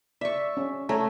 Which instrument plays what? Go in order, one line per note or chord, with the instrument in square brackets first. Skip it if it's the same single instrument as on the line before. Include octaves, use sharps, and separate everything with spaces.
[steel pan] D5 [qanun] E5 C#6
[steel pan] C#4
[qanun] A3 [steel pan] C#5 G#5 A#5